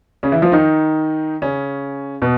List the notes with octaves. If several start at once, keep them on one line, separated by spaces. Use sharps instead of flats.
C#3 C#4
E3 E4
F3 F4
D#3 D#4
C#3 C#4
B2 B3